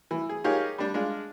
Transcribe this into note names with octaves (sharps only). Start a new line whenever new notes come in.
E3
G#4
D#4 F4 G4 G#4 A#4 C#5
G3 D4
G#3 D4 F4